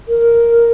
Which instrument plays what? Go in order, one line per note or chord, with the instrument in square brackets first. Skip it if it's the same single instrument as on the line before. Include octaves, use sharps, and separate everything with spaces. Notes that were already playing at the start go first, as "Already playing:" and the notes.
[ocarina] A#4